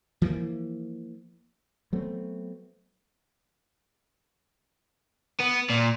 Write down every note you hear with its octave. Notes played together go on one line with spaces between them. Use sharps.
E3 F3 A3 A#3
F#3 A3 B3 C4
B3
A#2